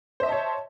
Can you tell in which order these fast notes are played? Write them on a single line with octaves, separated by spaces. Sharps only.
C5 E5 D#5 A5 C#5